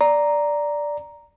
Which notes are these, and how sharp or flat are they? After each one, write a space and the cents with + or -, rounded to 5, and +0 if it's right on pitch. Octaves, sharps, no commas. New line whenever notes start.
D5 +0 A#5 +0